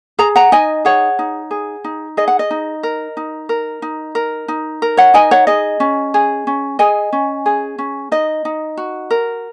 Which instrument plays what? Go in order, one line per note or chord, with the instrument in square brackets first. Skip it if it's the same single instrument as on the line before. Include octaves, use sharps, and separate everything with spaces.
[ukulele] G#4 A#5
F#5 A#5
D#4 D#5 G#5
G#4 C#5 F#5
D#4
G#4
D#4
G#4 D#5
F#5
D#5
D#4
A#4
D#4
A#4
D#4
A#4
D#4
A#4
C#5 F#5
D#4 D#5 G#5
C#5 F#5
G#4 D#5
C#4
G#4
C#4
G#4 D#5 G#5
C#4
G#4
C#4
D#4 D#5
D#4
F#4
A#4